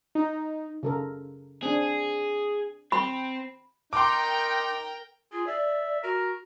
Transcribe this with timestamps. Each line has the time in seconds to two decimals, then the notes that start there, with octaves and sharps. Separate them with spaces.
0.15 D#4
0.83 C#3 A4 A#4
1.63 C4 D4 G#4
2.92 C4 B5
3.93 D#4 A#4 G5 C6 D6
5.32 F4 G#4
5.47 D5 E5
6.03 F#4 A#4